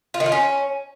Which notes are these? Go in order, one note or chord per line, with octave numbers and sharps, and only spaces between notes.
F4
D#3
F4
C#4